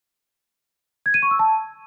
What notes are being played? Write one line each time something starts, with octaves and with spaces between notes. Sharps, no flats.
G#6
D#7
C#6
E6
A5